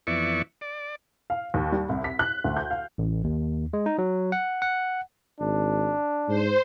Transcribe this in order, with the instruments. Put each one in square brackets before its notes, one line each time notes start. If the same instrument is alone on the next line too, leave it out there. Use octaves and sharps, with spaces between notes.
[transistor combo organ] F2 E3 B3 D5 E5 C#6
D5
[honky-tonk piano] F5
D#2
G3
C2
B6
F#6
D2
G6
F5
[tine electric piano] A1
D#2
G#3
D#4
F#3
F#5
F#5
[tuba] G#1 [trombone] D4
[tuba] G#2 [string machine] C5